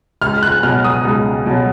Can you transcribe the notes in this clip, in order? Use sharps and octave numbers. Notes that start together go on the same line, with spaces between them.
C#2 F6
F#6
B2 F#3 F6
D#6
C#2
B2 F#3